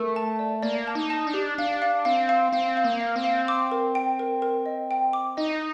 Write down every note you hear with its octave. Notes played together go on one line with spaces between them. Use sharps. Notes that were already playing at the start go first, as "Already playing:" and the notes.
Already playing: A3 A#4
A5
D5
A#3 D5
A5
D#4
A5
D4
G4
D4 F5
F5
C4 F5
F5
C4 F5
F5
A#3
F5
C4
F5
D6
A#4
G5
A#4
A#4
D#5
G5
D6
D#4 D#5